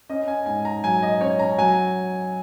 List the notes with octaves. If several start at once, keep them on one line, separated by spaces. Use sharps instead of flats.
C#4 D#5
G#5
G#2 G#5
A#5
F#3 G#5
D#5
C#4 C#5
A#5
F#3 G#5